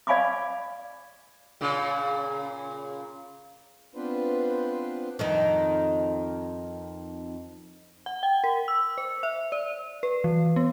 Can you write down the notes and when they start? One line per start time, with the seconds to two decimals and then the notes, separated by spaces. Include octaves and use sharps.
0.07 D5 F5 G#5 B5 C#6 D6
1.61 A#2 C#3
3.95 B3 C4 D4 F4 B4 C5
5.19 F2 D#3 D#4
8.06 F#5
8.23 G5
8.44 A#4
8.68 E6
8.98 C5
9.23 E5
9.52 D5
10.03 B4
10.24 E3
10.56 B3